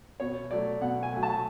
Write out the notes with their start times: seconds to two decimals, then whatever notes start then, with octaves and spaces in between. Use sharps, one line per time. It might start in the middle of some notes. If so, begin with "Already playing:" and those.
0.20 B2 C#5
0.51 F#3 A3 D5
0.81 B2 F#5
1.03 G#5
1.13 F#3 A3
1.23 A5